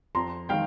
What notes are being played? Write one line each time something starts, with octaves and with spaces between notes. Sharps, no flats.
F2 A#5 C6
D#3 G#3 F5 G5